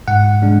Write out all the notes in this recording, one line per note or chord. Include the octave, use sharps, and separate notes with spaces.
G#2 F#5
G#3 D4